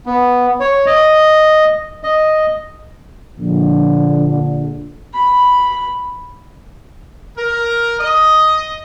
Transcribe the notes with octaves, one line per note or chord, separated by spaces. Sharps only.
B3
C#5
D#5
D#5
A#1 D3
B5
A#4
D#5